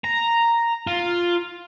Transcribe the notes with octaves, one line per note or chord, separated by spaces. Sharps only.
A#5
F4